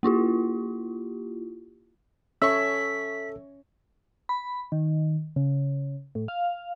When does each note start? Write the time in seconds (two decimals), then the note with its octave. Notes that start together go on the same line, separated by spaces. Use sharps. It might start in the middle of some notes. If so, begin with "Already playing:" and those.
0.03 A#3 E4 F4 G4
2.42 C#4 A4 C#5 E5 C#6 E6 B6
4.29 B5
4.72 D#3
5.36 C#3
6.15 A2
6.28 F5